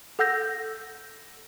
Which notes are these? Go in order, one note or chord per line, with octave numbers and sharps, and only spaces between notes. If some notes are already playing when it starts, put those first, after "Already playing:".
A4 F#5 E6 G6 A#6